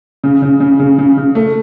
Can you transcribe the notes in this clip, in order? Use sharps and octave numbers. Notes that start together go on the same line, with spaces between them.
C#3
C#3
C#3
C#3
C#3
C#3
A3